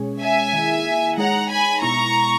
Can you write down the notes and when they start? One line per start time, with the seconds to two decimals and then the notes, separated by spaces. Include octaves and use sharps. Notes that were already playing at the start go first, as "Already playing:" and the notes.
Already playing: B2 G#3 C#4 G#4 C#5
0.20 E5 G#5
0.53 D#3 A#3 E4 G#4
1.17 G#3 D#4 G#4 C#5 F#5 A#5
1.50 G#5 B5
1.82 B2 G#3 B3 E4 A#5 C#6